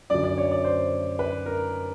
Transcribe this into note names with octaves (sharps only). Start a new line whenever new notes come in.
F#2 D3 F#3 D5
D5
C#5
D5
C5
B4
A#4